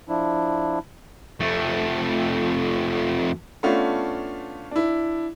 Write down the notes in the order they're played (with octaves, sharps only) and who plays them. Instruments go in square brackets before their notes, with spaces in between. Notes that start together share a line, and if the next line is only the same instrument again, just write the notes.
[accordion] F3 D4 E4
[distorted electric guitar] F2 A3
[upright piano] A3 B3 C#4 D4 F4
D4 E4